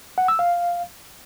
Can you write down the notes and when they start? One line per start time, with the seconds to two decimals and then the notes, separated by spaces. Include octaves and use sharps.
0.18 F#5
0.28 E6
0.39 F5